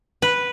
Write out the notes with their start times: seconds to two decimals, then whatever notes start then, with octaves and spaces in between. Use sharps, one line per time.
0.22 B4